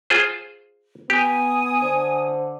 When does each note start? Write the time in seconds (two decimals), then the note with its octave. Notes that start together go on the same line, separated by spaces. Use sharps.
0.10 F4 G#4 C5
1.10 B3 G4 G#5 D#6
1.82 D3 C5